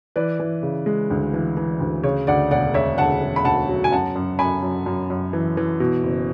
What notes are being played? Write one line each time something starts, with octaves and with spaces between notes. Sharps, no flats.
E3 B4 D5
E3
C#3
G#3
D2
E3
E3
D2
C#3 C#5
D2 D5 F#5
E1 D5 F#5
E1 C#5 E5
D2 F#5 A5
E1
B5
D2 F#5 A5
F#3
G#5
F#2 F#5 A5
F#2
F#2 G#5 B5
F#2
F#2
F#2
E3
E3
B2
F#1